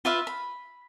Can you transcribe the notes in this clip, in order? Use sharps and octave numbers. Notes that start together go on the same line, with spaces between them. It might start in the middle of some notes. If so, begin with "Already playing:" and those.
F4 B4 E5 F5
B5